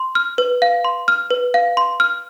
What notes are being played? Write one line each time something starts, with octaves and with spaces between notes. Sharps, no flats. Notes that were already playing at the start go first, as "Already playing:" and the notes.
Already playing: C6
F6
B4
F5
C6
F6
B4
F5
C6
F6